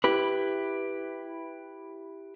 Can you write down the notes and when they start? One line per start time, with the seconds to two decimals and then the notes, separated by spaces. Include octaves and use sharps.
0.04 E4 G4 B4